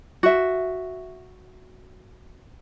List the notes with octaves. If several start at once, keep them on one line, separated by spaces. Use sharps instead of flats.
F#4 E5